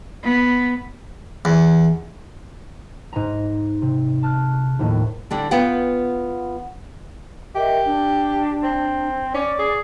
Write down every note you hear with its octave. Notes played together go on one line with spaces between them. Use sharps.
B3
E2
G#2 G#5 A#5
C3
A5 F6 F#6
F1 D#2 A2
D3 G3 D4
B3 F4 F#5 G5
G4 A#4 D#5 E5
D4
C4
C#4 D5 D6
G#4